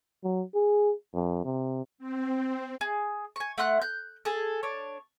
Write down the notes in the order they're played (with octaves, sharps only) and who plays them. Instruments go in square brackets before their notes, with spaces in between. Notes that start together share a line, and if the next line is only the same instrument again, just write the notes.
[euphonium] F#3
G#4
F2
C3
[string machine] C4
[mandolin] G#4
G#5 C#6
A3 F#5 C6 F#6
F#6 G6
G#4 A4
D4 C#5